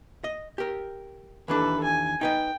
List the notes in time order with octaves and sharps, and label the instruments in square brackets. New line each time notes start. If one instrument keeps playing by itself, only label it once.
[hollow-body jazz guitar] D#5
G4 A#4
[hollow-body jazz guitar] D#2 E3 D4 [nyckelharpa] A4 B4
[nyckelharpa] G#5
[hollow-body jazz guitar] D#4 B4 D#5 [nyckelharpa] G5